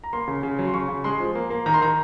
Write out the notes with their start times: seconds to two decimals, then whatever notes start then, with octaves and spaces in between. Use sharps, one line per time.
0.04 A#5
0.13 A#3 C6
0.28 C#3
0.43 C#3
0.59 F#3
0.67 C6
0.74 C#3 C#6
0.89 C#3
1.04 G#3 C6
1.20 F3
1.35 A#3
1.50 A#3
1.66 D#3 A#5
1.74 C6
1.81 D#3 A#5